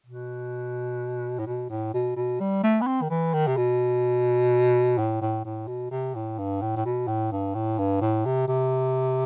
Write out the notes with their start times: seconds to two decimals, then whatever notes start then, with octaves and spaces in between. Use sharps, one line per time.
0.06 B2
1.39 A2
1.46 B2
1.69 A2
1.94 B2
2.16 B2
2.40 G3
2.63 A3
2.81 B3
2.87 C4
3.02 D#3
3.10 E3
3.33 D#3
3.47 C3
3.57 B2
4.98 A2
5.21 A2
5.45 A2
5.67 B2
5.91 C3
6.15 A2
6.38 G2
6.62 A2
6.76 A2
6.85 B2
7.07 A2
7.31 G2
7.54 A2
7.78 G2
8.01 A2
8.25 C3
8.48 C3